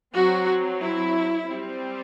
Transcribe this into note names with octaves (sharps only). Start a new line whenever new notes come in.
F#3 C4 F#4
E4
G3 C4